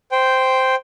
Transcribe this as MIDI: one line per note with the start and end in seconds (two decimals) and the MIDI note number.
0.12 0.75 72
0.12 0.75 79